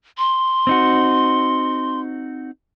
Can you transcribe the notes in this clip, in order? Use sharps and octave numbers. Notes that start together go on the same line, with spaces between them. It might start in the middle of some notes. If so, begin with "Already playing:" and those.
C6
C4 D#4 F#4